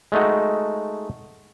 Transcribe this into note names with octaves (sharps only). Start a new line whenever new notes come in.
G#3 A3 D#4 F#4